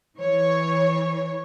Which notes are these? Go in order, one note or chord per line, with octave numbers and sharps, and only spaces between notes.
E3 C#5